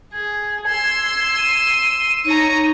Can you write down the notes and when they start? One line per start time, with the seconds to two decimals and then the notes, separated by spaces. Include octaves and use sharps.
0.13 G#4 G#6
0.67 C6 E6
1.37 D#7
2.25 D#4 C#5 A#5